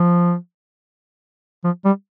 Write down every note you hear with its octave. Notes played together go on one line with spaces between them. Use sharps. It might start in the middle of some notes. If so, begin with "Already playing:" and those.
Already playing: F3
F3
G3